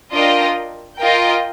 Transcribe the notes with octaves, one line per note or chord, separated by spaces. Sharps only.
D4 F4 A#4 D#5 G5
F4 A#4 D#5 G5